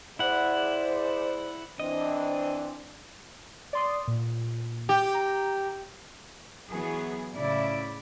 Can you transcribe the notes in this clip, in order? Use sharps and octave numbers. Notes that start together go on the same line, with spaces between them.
E4 G#4 C5 D5 F#5
E3 C4 D4 D#5
D5 C6 D#6
A#2
G4
A#5
E3 F#3 B3 G#4
A2 C#3 E4 D5